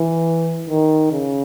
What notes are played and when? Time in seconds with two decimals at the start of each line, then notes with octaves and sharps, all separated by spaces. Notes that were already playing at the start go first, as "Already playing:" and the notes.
Already playing: E3
0.70 D#3
1.13 C#3